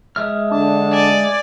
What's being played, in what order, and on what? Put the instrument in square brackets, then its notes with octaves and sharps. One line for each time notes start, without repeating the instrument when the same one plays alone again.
[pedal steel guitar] G#3 E5 F6
[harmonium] D3 A5 [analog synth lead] D4
[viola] D5 [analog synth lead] G#5